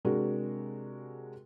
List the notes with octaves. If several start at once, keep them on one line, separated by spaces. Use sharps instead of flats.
C3 G#3 D4 F#4 G#4 A#4